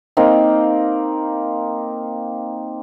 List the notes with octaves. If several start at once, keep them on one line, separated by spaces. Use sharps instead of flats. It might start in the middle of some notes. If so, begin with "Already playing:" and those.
A#3 C4 D#4